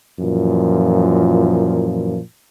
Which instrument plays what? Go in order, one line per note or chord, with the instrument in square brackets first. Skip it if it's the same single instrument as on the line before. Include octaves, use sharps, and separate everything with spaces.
[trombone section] F#2 A#2 E3 F3